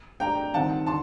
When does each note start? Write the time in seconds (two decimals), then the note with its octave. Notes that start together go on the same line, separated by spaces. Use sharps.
0.20 A3 D4 G4 G5 A#5
0.54 D#3 G3 C4 D#4 F#5 A5
0.87 D3 A5 C6